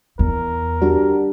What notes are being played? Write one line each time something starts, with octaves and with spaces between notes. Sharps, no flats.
E2 A#4
G3 D4 F#4